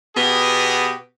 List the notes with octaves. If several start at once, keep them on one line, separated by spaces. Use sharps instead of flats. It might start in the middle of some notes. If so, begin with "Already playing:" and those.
B2 B3 G4 G#4